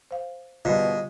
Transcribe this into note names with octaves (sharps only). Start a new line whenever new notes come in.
C5 F5
G#2 B2 D3 G3 F4